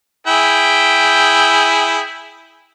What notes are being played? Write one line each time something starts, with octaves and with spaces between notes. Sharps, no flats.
E4 G#4 G5